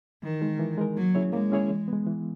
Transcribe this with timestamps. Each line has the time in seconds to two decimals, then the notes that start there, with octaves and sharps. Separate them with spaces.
0.23 D#3 E3
0.42 G#3 D#4 A#4
0.59 E3
0.78 G#3 D#4 A#4
0.96 F#3 A#3
1.15 C#4 E4 G#4 C#5
1.33 G#3 A#3
1.52 C#4 E4 G#4 C#5
1.70 E3
1.88 G#3 B3
2.06 E3